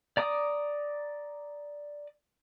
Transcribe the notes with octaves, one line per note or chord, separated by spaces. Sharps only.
D5 A#5 D6 D#6